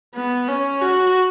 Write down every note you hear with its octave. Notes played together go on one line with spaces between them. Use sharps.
B3
C#4
F#4